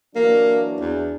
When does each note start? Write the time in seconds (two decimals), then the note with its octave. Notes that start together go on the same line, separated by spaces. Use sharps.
0.16 E3 F#3 A#3 D4
0.80 E2